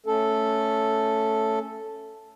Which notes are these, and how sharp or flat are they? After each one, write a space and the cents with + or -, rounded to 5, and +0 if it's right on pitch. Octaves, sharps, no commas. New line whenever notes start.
A3 +0 C#4 +0 A4 +0